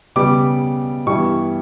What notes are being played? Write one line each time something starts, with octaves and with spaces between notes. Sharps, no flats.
C#3 G3 B3 D6
G2 E3 G3 B3 C#6